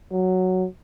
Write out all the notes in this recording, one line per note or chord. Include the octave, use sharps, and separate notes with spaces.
F#3